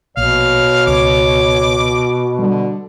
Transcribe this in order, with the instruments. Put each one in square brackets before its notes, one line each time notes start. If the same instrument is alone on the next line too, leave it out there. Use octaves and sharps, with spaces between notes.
[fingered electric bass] A#1 [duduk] B2 [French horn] C#5 [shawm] F5
[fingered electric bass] C#2 [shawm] D6
[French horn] D3 [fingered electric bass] G3